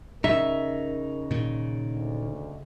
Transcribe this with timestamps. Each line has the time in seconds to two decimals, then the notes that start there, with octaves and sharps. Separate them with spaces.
0.24 C#3 D#4 A#4 E5
1.31 A#2 D#3
1.87 D2